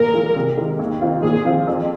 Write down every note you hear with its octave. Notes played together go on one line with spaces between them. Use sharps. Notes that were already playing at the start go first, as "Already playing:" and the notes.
Already playing: A#2 A#4
F3 G#3
C3
D#3 G#3
D#2
D#3 C4 F4
A#2 G#4
F3 C4 F4
F2